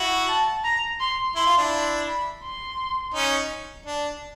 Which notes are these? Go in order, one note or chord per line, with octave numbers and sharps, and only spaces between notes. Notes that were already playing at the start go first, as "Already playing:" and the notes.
Already playing: E4 F#4
A5
A#5
C6
E4 C6
F4
D4 E4
B5
B5
C6
C#4 D#4
D4